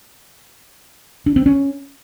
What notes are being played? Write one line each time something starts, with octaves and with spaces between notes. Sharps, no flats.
D4
C4
C#4